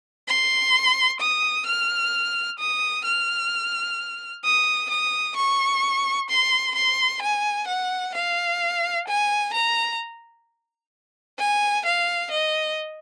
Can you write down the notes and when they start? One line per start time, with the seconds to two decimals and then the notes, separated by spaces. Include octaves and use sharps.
0.28 C6
1.20 D#6
1.67 F6
2.59 D#6
3.05 F6
4.44 D#6
4.90 D#6
5.36 C#6
6.29 C6
6.75 C6
7.22 G#5
7.68 F#5
8.15 F5
9.08 G#5
9.53 A#5
11.39 G#5
11.85 F5
12.31 D#5